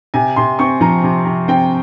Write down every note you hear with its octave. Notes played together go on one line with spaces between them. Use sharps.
C3 G#5
C3 C6
C4 C#6
F3 A#5
C3
C3
C4 G5